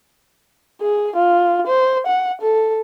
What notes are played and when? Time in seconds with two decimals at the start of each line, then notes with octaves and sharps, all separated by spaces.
0.81 G#4
1.16 F4
1.67 C5
2.06 F#5
2.41 A4